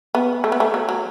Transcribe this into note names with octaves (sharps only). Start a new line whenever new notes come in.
B3
A3
B3
A3
F#3
F#3